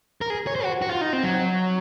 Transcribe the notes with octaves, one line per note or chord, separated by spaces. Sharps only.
A#4
G#4
C#5
C5
F#4
F#4
F4
D#4
C4
F#3